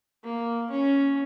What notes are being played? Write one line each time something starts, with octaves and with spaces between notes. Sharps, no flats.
A#3
C#4